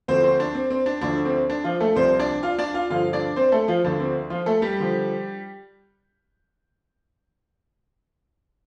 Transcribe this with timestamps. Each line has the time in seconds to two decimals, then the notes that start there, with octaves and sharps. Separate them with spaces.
0.08 D2 D3 F3 C4 C5
0.23 C4 C5
0.40 D4
0.55 C4
0.70 C4
0.86 D4
1.01 D2 D3 F3 D4
1.25 C4
1.50 D4
1.64 F3 F4
1.81 A3 A4
1.95 C2 C3 F3 C4 C5
2.19 D4 D5
2.43 F4 F5
2.59 D4 D5
2.74 F4 F5
2.90 G2 D3 F3 F4 F5
3.13 D4 D5
3.36 C4 C5
3.52 A3 A4
3.68 F3 F4
3.84 D2 D3 F3 D4
4.00 C4
4.30 F3 F4
4.46 A3 A4
4.62 G3 G4
4.80 D3 F3